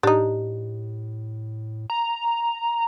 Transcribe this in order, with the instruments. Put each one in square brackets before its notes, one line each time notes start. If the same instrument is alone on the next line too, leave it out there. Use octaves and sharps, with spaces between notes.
[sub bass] A2 [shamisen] D4 D#4 [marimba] G4
[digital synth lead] A#5